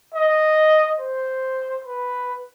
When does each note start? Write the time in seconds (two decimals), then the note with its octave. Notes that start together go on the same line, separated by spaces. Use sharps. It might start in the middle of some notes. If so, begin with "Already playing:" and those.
0.14 D#5
1.00 C5
1.85 B4